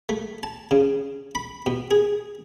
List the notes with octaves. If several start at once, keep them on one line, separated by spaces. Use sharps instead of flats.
A3
A5
C#3
B5
B2
G#4